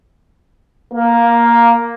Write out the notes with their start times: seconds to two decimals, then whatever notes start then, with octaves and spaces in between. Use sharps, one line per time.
0.94 A#3